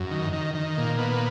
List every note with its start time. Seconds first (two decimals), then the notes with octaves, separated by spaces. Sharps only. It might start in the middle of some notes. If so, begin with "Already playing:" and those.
Already playing: F#2
0.11 D#3
0.33 D#3
0.55 D#3
0.77 A#2
0.98 B3